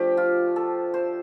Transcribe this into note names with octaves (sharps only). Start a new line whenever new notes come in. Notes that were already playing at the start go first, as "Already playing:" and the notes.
Already playing: F3 A3 D4 G4
F4
A4
C5